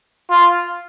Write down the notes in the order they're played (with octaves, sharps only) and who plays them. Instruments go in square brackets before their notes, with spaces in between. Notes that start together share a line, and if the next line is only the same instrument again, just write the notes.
[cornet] F4